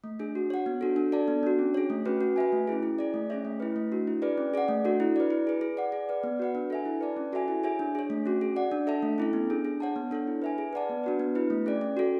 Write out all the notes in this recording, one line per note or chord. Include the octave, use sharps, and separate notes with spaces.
A3
D4 G#4
F#4
C#5 F#5
B3
D4 F#4 A4
D4
A4 D5 A5
B3
D4 F#4
C#4
G#4 C#5
A3
C#4 F#4 B4
F#4
B4 E5 G#5
A3
C#4 E4 G#4
E4
G#4 D5
A3
C#4 G#4 C#5 E5
A3
E4 B4
A3
D4 F#4
E4
G#4 B4 D5
C#4
G#4 D5 F#5
A3
D4 F#4 A4
E4
B4 D5
E4
G#4 B4
G#4
D5 F#5
G#4
B4 D5
B3
F#4 B4 F#5
D4
A4 E5 G#5
E4
B4 D5 A5
C#4
F#4 A4 E5 G#5
E4
G#4 C#5 E5 G#5
D4
G#4 C#5
A3
C#4 F#4
G#4
D5 F#5
D4
A4 E5 A5
A3
C#4 E4 A4
B3
D4 G#4
G#4
C#5 F#5 A5
B3
D4 A4 C#5
E4
B4 E5 G#5
G#4
B4 D5 F#5 A5
B3
D4 F#4 B4
B3
E4 B4
A3
C#4 G#4 D5
C#4
F#4 A4